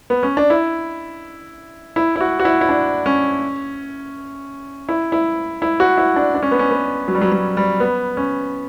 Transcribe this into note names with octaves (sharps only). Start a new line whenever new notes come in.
B3
C#4
D4
E4
E4
E4
F#4
F#4
E4
E4
D4
C#4
E4
E4
E4
F#4
E4
D4
D4
C#4
B3
C#4
B3
F#3
G3
F#3
F#3
G3
B3
C#4